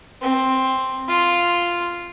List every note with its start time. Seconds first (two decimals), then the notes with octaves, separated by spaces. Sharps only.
0.22 C4
1.08 F4